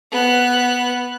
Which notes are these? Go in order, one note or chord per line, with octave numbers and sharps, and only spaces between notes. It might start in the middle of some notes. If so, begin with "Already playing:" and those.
B3 F#6